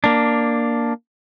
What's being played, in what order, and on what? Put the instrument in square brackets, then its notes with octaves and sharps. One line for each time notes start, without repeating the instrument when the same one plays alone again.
[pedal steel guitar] A#3 D4